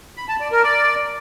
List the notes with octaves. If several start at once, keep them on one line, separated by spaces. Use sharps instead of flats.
B5
A5
D5
A#4
D5